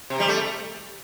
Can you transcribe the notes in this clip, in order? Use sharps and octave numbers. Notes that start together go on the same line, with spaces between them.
C3
G3
A3